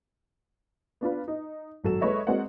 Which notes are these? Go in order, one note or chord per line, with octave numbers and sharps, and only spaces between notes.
B3 D4 F4 B4
D#4
G#1 F#3 A4 E7
G#3 A4 B4 C#5 D#5 E5
G#3 C4 F#4 A#4 D5 F#5